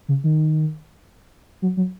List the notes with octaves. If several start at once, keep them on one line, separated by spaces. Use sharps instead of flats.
C#3
D#3
F#3
F#3